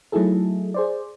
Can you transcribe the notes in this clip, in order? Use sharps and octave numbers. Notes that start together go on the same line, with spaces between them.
F#3 A3 D#4 E4 G#4 A4
G#4 C5 D5